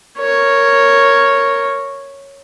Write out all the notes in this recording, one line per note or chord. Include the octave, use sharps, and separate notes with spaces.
A#4 C#5